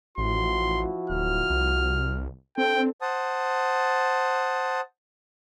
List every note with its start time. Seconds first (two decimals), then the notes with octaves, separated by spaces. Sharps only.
0.18 A1 F3 E4 F#4 C6
1.10 D1 F6
1.50 C2
2.58 C4 D4 A4 G5
3.01 C5 F#5 A5 D#6